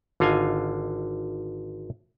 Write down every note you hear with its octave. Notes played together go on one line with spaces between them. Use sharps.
G#1 D3 F4 D#5 F5 G#5